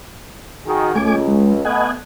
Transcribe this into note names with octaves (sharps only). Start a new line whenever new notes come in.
D#3 F#4 G#4
C#2 A3 G#5 D6
G#3
A3 B3 D#5 F#5 G#5